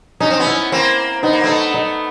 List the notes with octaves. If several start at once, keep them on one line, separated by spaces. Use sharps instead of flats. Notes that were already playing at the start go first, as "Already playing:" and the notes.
C#4 D#4
C4
B3 C#4
E4
A#3 C4
B3 D#4
A#3
A3 B3 D#4
D#4